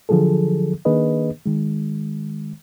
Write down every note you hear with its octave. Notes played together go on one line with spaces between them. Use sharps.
D3 F3 F#3 G#4 A4
D#3 A#3 D4 G#4 B4 D#5
D#3 G#3